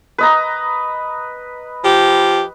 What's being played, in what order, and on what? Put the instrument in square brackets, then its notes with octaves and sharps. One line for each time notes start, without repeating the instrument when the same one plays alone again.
[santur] B4 D#5 A#5
[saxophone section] F3 G4